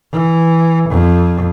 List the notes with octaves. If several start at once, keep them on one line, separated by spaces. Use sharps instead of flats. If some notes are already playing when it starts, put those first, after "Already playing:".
E3
F2